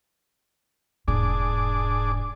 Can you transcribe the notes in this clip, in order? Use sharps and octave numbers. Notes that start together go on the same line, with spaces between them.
E1 G#2 D4 G#4 D6